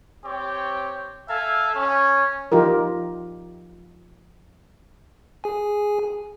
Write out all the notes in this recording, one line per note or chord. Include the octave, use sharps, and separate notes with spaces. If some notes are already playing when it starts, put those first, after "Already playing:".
C4 G4 C#5 G5
A4 E5 F5 G#5
C#4
F3 D#4 F4 G4 A#4
G#4 G#5